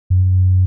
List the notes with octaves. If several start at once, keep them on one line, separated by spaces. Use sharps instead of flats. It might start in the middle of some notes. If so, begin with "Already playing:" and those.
F#2